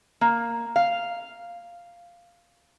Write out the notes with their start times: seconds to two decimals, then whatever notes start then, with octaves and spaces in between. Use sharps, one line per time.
0.21 A#3
0.76 F5